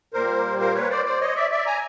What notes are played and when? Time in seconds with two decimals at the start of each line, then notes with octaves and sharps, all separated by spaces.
0.14 A#2 G3 A#3 A#4 C5
0.60 A#4 C5
0.74 B4 C#5
0.90 C5 D5
1.05 C5 D5
1.21 C#5 D#5
1.36 D5 E5
1.51 D5 E5
1.66 G#5 A#5